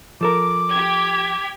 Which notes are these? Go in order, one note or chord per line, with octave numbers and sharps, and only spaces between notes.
F3 A4 A#4 D6
G4 G#6